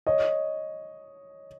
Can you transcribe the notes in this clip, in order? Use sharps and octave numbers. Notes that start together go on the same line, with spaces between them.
C#5 D#5